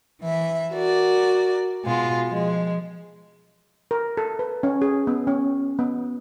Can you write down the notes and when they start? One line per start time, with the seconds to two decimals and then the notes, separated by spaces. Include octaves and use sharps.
0.20 E3 E5
0.73 F#4 A#4 D5
1.84 B2 G#3 F4
2.28 F3 G#3
3.91 A#4
4.17 A4
4.39 B4
4.63 C#4
4.82 G#4
5.07 B3
5.27 C#4
5.79 B3